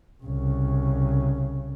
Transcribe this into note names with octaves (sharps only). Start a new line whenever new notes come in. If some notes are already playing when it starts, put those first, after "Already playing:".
C2 C#3